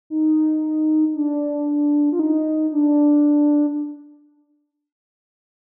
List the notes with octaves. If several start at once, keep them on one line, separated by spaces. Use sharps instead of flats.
D#4
D4
F4
D#4
D4